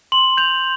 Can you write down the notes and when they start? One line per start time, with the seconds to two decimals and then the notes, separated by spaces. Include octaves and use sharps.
0.12 C6 F#7
0.37 G6 F7